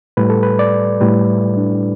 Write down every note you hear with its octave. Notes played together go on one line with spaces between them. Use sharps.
A2 G3 B4
A4
B4
D5
A2 G3 B4
E4
D4